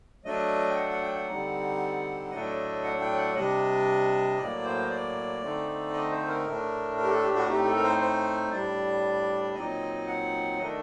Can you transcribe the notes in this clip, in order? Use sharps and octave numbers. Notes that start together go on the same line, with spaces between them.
F#3 A3 D4 D#5
G5
F#5
F#5
G5
F#5
D3 G3 C4 D#4
A2 F#3 A3 D4 D#5
F#5
G5
F#5
C3 G3 D4 D#5
A2 F#3 A#3 D5
C5
D5
D3 A3 C4 D#4
D#5
C5
A#4
A2 A3 D4
A#4
G4
A4
G4
F#4
A2 A3 C4 D#4 G4
A4
A#4
C5
C5
A2 G3 D4 D5
A#2 F#3 C4 D#4 D#5
F#5
D#3 A3 D4 D#5